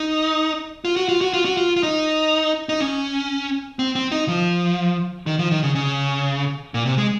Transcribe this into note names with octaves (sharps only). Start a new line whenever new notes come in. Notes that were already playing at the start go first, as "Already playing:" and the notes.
Already playing: D#4
F4
F#4
F4
F#4
F4
F#4
F4
F4
D#4
D#4
C#4
C4
C4
D#4
F3
D#3
F3
D#3
C#3
C#3
A#2
C3
G#3